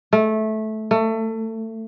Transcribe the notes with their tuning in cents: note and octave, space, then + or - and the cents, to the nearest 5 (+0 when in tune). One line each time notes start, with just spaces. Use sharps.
A3 -15
A3 +25